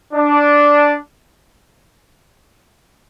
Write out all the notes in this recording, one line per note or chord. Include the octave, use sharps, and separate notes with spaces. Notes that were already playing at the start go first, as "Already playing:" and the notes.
D4